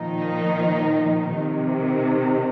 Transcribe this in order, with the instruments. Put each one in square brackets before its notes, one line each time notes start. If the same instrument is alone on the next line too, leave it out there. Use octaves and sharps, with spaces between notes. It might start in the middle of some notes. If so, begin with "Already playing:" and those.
Already playing: [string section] A#2 D#3 F3 D#4
C3 D#3